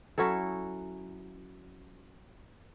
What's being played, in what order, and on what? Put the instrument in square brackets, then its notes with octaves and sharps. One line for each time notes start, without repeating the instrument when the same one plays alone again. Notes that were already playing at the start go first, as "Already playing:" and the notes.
[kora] F#3 C#4 E4 A4